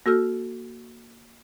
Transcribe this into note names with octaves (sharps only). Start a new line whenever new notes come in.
A#3 F#4 A4 E6 F6